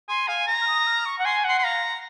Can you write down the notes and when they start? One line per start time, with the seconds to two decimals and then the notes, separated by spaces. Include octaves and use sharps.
0.09 G#5 C6
0.28 F5 G#5
0.47 A#5
0.61 F6
0.67 D#6
0.87 F6
1.05 C#6
1.19 F#5
1.25 G#5 C6
1.44 F#5 C6
1.58 C6
1.64 F5 A#5